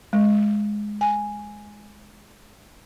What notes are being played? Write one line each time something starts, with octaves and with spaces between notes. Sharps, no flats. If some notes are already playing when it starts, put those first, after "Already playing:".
G#3
G#5